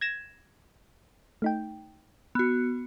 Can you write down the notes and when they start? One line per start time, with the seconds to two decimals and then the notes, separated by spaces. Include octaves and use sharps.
0.01 G#6 A#6 E7
1.42 A3 D#4 G5
2.35 B3 F#4